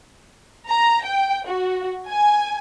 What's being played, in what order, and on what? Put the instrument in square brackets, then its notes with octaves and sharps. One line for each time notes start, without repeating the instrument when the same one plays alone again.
[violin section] A#5
G5
F#4
G#5